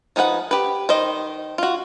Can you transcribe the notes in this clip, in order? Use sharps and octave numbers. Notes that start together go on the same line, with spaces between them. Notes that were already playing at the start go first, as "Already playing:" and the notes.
F3 D#4 G#4 B4 F#5
G4 B4
D#3 C5 D#5
F4 F#4